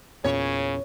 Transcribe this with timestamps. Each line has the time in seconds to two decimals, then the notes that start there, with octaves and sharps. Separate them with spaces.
0.24 E2 A#2 C#3 C#4 C#5